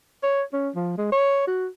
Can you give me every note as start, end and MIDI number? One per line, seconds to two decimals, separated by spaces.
0.23 0.42 73
0.53 0.70 61
0.75 0.98 53
0.98 1.10 56
1.12 1.44 73
1.47 1.67 66